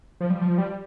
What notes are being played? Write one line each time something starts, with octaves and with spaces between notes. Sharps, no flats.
F3
G3
F3
G3